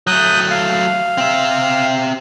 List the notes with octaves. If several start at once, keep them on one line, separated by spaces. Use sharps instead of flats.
F#3 A3 D#6 F#6 G6
F5
C4 E5